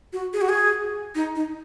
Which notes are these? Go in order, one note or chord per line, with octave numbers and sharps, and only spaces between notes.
F#4
G#4
F#4
G#4
D#4
D#4